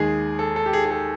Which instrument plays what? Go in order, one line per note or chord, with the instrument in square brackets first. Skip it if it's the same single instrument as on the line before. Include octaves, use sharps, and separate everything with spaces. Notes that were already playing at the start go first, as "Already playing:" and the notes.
Already playing: [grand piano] D#2 D#3 G#3 G#4
A4
A4
G4
G#4
G#4
A4